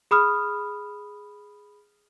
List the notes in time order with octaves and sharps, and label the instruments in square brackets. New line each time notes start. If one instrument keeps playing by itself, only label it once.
[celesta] G#4 B5 D#6 F6